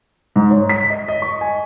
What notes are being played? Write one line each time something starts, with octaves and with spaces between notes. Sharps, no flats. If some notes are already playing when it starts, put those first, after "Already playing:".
G#2
C#5
B6
D#5
D#5
C#6
G#5